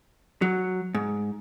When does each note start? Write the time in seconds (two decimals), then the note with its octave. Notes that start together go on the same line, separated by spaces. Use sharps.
0.42 F#3
0.95 G#2